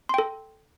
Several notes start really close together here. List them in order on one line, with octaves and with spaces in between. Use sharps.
C6 G5 A4